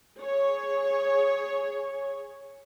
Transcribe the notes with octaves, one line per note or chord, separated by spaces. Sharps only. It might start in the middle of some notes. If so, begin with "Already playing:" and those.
G#4 C#5